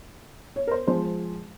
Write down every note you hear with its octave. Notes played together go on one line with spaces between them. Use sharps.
C#5
A#4
C5
F3 G#3 C5